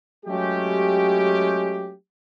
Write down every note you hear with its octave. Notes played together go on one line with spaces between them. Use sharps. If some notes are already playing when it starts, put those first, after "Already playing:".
F#3 G#3 A3 C#4 G4